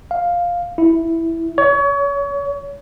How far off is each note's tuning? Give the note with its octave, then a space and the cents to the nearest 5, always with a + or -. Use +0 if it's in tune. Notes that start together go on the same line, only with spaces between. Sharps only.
F5 +5
E4 +0
C#5 +30